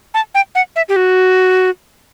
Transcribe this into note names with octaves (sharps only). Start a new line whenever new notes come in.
A5
G5
F#5
E5
G4
F#4